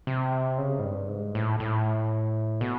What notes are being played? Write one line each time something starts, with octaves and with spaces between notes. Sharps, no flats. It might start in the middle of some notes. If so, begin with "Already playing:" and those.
C3
C#3
G#2
G2
G#2
A2
A2
B2